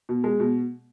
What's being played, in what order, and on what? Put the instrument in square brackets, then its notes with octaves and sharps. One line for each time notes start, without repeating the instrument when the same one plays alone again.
[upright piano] B2
G#3
B2